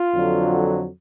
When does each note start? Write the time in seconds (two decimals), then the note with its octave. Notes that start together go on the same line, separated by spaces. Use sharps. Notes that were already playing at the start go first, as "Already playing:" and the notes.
Already playing: F4
0.13 F2 D3 F#3